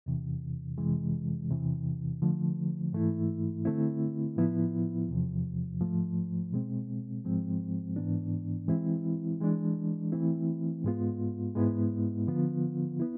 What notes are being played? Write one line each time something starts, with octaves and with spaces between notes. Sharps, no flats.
E2 C3 E3
F2 C3 E3 G#3
E2 C3 E3
D3 F3 A3
G#2 E3 A3 E4
D3 A3 C4 E4
A2 F3 B3 E4
E2 C3 F3
G#2 F3 A3
B2 G#3 C4
G#2 F3 G#3 C4
G#2 E3 B3 D4
E3 G#3 C4 E4
E3 G#3 D4
E3 A3 C4 E4
G#2 G#3 B3 F4
G#2 G#3 B3 E4
D3 F3 B3 F4
B3 E4